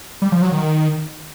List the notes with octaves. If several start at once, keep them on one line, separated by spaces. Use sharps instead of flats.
G3
F3
F#3
D#3